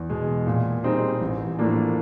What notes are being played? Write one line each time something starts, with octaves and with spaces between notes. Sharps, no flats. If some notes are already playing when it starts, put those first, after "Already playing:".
Already playing: E2
B2 G#3
A#2
G3 C4 D#4 G#4
A1
A2 F3 A#3 D4